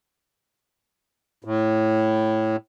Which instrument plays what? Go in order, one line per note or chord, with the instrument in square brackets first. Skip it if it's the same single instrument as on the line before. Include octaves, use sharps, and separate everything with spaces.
[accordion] A2